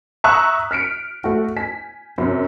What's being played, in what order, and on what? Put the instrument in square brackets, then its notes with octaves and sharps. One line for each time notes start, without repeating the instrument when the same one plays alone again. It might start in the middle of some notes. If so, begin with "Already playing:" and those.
[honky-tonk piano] E5 A#5 C#6 D#6 E6 F#6
F6 B6 C#7 D7
A3 F#4
G#5 B6
F#2 C3